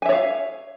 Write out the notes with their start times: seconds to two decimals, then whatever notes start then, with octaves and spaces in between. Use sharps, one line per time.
0.02 G#5
0.06 E5
0.09 C#5
0.12 F5